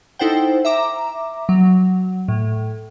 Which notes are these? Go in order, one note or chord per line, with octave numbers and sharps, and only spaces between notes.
D#4 E4 A4 C5 F#5 G5
E5 A#5 D6
F#3
A2